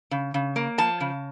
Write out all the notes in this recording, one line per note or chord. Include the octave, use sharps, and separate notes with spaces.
C#3
C#3
A#3
F3 A5
C#3